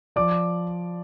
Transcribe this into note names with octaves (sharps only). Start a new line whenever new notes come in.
F3 D5 D6